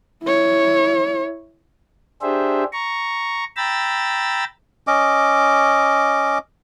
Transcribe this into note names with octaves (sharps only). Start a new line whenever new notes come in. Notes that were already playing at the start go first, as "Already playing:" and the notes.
E4 C#5
D4 G4 G#4 C5 E5
A#5 C#6
G5 A#5 B5 E6 A6
C#4 D#5 D6